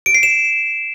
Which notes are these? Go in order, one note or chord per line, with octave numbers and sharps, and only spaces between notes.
D7
C7
E7